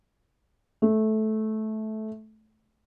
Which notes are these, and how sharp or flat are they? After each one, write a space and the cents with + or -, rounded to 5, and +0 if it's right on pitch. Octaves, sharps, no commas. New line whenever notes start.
A3 -15